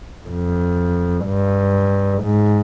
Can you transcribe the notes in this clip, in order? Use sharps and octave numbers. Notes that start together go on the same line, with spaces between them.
F2
G2
G#2